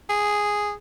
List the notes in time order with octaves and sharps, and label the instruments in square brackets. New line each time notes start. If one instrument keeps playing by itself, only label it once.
[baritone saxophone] G#4